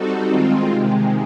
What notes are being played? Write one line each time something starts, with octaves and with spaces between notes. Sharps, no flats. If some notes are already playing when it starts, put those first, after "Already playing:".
Already playing: G3 C4 D#4 F#4 A4
D#3 G#3 C4 F4
C3 D#3 G#3